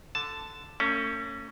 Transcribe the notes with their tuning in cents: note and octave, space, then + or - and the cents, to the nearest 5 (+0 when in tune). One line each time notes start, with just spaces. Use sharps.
D3 +0 A5 +0
A3 +45 C#4 +0